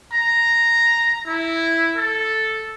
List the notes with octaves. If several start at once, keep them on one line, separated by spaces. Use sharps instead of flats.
A#5
E4
A4